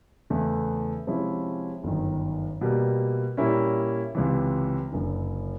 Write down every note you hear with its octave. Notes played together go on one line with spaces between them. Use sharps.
E2 C#3 E3 A3
C3 F3 G#3 C#4 E4
G1 F#2 D#3
B2 G3 A#3
A#2 G3 A#3 C#4 E4
C#2 C3 E3
F#1 F#2 D3